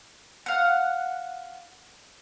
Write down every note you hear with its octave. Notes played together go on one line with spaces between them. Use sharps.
F5 F#5